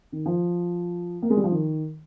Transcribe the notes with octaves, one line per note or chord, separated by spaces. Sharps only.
D#3
F3
A#3
G#3
G3
F3
D#3